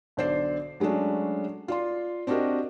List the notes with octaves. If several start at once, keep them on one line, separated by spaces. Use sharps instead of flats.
B1 D3 C5 D5 C7
F#3 G#3 A3 C#4 D4
F4 D5 C6
C4 D4 F#4 G4 A#4 D#5